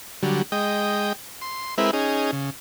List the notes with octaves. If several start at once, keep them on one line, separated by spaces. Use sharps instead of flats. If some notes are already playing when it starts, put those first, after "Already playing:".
D3 F#3 G3
G#3 D#5 G5
C6
G#3 C4 E4 A#4 B4 E5
C#4 D#4 G#4
C#3